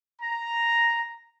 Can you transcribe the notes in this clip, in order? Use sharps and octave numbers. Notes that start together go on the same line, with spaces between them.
A#5